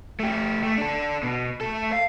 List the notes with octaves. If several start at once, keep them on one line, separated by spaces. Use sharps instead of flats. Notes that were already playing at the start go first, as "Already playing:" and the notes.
A3 G4
A3
D4 A4
B2
A3 A4
F5